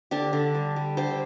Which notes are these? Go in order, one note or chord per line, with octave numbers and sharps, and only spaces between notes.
D3 D4 G4
D3
G3
G3
D3 G4 C5